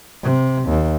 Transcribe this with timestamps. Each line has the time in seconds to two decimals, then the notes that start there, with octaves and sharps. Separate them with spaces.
0.23 C3
0.68 D#2